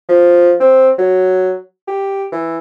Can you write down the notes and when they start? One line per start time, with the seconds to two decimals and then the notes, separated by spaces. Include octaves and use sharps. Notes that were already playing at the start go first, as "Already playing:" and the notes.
0.09 F3
0.60 C4
0.98 F#3
1.88 G4
2.32 E3